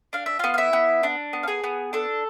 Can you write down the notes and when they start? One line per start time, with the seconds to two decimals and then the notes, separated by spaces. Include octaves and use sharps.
0.13 D4 F5
0.26 E5
0.39 B3 F4 F5
0.54 F5
0.58 E4 E5
0.73 B3
1.03 D4
1.33 B3
1.43 F5
1.48 G#4 G#5
1.64 B3
1.93 D4 A4